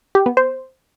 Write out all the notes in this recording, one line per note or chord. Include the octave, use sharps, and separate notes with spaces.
G4
B3
C5